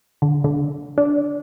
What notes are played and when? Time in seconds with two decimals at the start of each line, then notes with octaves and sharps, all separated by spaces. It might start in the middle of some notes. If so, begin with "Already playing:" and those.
0.22 D3
0.44 D3
0.98 D4